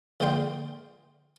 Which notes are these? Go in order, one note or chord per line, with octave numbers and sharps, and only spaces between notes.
A#1 D3 G#3 F4 G5 C6